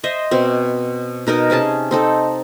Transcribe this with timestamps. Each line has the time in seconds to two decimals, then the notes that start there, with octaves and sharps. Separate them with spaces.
0.04 C5 D#5 E5
0.31 B2 C4
1.27 B2 D#4 A#4 D#5
1.50 C3 C#4 G#4 A5
1.91 C4 D#4 A4